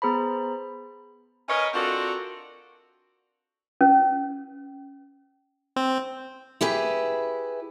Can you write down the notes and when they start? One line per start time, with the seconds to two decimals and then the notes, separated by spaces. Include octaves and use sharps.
0.02 B3 G#4 C5 A#5 B5
1.48 C#4 A#4 B4 C#5 D#5
1.74 C4 D4 F4 F#4 A4 A#4
3.81 C#4
5.76 C4
6.61 E4 G4 G#4 B4